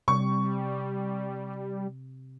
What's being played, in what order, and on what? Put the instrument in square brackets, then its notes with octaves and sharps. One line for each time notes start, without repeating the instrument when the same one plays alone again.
[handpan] C3 [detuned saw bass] G3 [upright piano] C#6